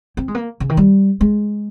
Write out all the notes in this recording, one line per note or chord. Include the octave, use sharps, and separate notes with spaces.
C4
G#3
A#3
C#3
D#3
G3
G#3